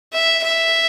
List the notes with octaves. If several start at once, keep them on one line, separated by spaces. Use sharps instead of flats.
E5
E5